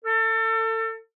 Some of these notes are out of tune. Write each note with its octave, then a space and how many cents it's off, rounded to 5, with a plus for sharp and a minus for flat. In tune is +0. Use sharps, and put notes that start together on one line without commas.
A4 +30